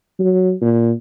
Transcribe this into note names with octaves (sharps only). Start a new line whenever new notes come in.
F#3
A#2